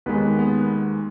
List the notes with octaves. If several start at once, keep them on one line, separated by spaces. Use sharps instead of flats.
D#2 D#3 G#3 B3 B4
B3 B4